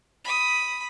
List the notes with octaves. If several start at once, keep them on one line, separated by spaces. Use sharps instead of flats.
B5 D#6